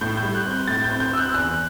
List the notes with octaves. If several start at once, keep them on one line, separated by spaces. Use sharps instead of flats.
A2 G6
G6
G3
F#6
C4 G6
A2 A6
C4 G6
G6
C4 E6
F#6
E6
E2 F#6